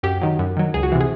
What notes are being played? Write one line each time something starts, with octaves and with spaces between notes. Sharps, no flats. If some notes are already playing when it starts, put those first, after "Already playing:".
F#2 G4
D#3 F#3
F#2
D#3 F#3
C#2 G#4
F#4
C3 E3
G#4